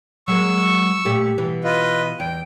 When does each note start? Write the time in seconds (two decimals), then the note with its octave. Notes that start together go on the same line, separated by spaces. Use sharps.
0.28 F#3 G#3 A#3 C#6 E6
1.05 A#2 A3 G4
1.38 B2 E3
1.64 F4 B4 D#5
2.20 E2 G5